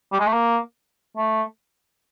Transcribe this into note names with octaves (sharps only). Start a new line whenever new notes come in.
G3
G#3
A3
A#3
A3